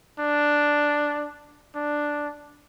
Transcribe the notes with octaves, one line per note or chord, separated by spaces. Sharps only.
D4
D4